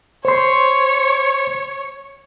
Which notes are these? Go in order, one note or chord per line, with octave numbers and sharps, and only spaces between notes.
C5 C#5 C6